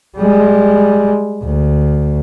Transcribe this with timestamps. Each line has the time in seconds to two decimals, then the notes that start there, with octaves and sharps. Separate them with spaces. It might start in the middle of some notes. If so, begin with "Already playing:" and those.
0.17 G3 G#3
1.44 D2